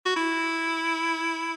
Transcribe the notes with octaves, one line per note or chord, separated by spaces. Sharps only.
F#4
E4